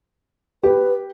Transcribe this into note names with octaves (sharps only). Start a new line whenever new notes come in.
G4 B4